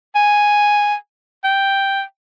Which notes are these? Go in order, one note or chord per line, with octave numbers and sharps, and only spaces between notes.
G#5
G5